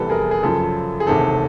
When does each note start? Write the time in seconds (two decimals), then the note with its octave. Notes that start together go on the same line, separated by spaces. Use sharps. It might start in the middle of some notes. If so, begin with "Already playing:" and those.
Already playing: F1 E2 C3 E3 G3 A4 B4
0.10 G#4 A#4
0.31 G#4
0.43 F#2 C#3 F3 A4
1.00 G#4
1.07 E1 D2 C3 D#3 A4